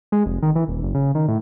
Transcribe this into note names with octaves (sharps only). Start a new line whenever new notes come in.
G#3
F1
D#3
E3
D#1
F#1
C#3
D#3
A2